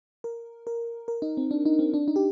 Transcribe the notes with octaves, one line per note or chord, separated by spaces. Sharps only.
A#4
A#4
A#4
D#4
C4
D4
D#4
C4
D4
D#4
G4